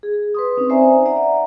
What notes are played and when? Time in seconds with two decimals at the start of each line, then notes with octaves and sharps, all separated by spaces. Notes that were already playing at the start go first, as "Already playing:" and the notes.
0.03 G#4
0.35 B4 C6 D#6
0.57 C4 C#4 D#4
0.70 C5 D5 E5 G#5 A#5
1.06 D5 E5 F#5 A#5